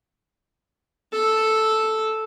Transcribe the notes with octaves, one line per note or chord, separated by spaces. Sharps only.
A4